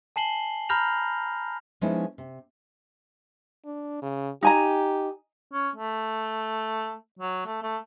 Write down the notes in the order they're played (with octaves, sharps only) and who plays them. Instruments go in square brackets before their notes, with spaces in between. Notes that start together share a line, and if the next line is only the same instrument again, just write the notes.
[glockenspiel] G#5 A5 C7 F#7 G7
A#5 B5 F6 G6 A#6 F7
[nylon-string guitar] F3 G#3 B3 C#4 D#4 E4
C3
[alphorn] D4
C#3
[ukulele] D#4 G#5 A#5 [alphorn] G4
[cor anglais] C#4
A3
F#3
A3
A3